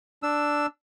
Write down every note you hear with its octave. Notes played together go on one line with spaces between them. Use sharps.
D4 E6